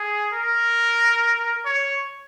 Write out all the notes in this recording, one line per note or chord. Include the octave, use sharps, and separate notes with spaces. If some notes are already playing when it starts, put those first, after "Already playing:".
Already playing: G#4
A#4
C#5